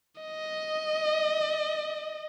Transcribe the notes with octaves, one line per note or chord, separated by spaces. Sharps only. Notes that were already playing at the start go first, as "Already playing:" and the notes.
D#5